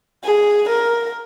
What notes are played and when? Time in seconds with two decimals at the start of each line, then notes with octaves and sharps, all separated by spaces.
0.24 G#4
0.69 A#4